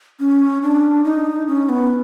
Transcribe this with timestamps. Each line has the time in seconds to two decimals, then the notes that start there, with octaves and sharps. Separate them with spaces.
0.20 C#4
0.63 D4
1.04 D#4
1.48 C#4
1.69 B3